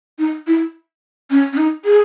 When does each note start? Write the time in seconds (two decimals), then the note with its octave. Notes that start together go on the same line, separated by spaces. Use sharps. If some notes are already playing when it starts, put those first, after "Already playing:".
0.19 D#4
0.47 E4
1.30 C#4
1.53 C#4
1.57 D#4
1.85 G#4